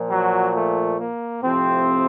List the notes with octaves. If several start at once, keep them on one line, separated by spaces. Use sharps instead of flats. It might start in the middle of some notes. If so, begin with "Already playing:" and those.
Already playing: A#2 F3
F#3 F#4
A3
A#3
A2 C3 F3 C4